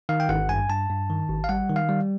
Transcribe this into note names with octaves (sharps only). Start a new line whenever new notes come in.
D#3 F5
G5
G#1 F#5
G2 G#5
G2 A5
G2
D#3
G#1
F5
G3 F#5
D#3
F5
G3